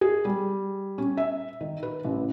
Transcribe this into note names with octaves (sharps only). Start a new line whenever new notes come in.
G#4
G3
C#4
E5
D#3
B4
A1